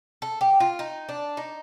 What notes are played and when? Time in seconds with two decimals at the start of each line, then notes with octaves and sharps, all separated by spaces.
0.22 A4
0.41 G4
0.60 F4
0.79 D#4
1.09 D4
1.37 D#4